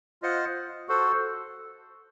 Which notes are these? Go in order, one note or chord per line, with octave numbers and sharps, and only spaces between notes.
F4 C5 D#5 F#5
F#4 A4 C5